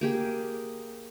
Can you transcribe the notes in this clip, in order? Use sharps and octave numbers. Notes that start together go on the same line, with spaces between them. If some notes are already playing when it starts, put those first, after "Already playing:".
A#3 G4 G#4